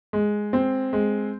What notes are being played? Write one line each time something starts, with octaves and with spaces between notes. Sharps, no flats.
G#3
C4
G#3